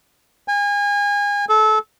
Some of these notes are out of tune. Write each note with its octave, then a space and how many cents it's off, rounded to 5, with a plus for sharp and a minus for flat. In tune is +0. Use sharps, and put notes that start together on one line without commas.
G#5 -30
A4 -25